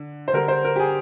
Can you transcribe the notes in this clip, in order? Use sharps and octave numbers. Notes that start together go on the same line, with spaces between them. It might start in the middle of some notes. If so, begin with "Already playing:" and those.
Already playing: D3
C5
D3 G3 A#4
C5
A#4
G4
G#4